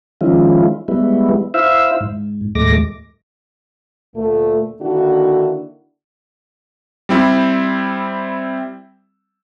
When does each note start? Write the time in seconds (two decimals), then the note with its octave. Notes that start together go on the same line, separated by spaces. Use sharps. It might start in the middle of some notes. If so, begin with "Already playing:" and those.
0.21 D#3 F3 G#3 C#4 E4 F4
0.88 G3 G#3 B3 E4
1.54 E4 C5 E5 F5 E6
2.01 G#2
2.55 D#2 A2 G#3 A3 D6 A#6
4.15 D2 A#2 A3
4.81 D3 D#3 A#3 D4 E4 F#4
7.09 G3 C4 E4